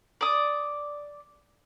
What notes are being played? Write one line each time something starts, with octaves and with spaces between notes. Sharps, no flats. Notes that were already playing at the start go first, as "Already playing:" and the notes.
D5 D#6